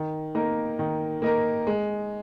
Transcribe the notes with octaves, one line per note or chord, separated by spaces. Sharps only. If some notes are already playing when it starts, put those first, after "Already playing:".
Already playing: D#3
A#3 D#4 A#4
D#3
A#3 D#4 A#4
G#3